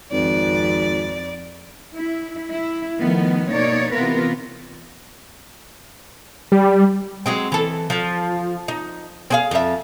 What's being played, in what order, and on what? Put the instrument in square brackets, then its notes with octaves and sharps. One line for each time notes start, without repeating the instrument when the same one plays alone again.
[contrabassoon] G#1 [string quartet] F2 D5
[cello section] E4
E4
D#3 F3 A3 B3
B2 A#3 D#4 C#5 D5
C3 E3 B3 F4 A#4 B4
[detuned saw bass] G3
[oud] F#3 G#3 C4
E3 A4
F3
D#4
C4 G#4 F5
F2 E5